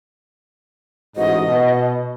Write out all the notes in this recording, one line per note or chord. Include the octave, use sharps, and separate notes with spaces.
A1 G#2 F#4 D#5
B2